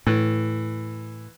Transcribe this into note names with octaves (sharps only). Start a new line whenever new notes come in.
A2 E3